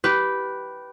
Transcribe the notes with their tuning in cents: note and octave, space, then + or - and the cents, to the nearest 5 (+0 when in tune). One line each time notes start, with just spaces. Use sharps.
G4 -15 B4 +0